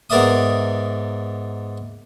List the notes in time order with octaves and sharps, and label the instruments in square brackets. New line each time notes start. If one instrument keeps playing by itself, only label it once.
[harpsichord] G#2 B3 A#4 D5 E5 D#6